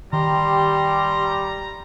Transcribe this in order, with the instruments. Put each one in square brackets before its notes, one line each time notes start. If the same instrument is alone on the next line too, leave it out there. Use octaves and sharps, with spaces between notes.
[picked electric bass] D#3 [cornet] G3 [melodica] G4 C6 [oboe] A#5